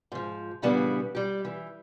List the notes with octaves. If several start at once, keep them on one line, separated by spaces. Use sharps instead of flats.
G#2 F3
A#2 C#3 E3 G3 B3 D4
G3 G4
E3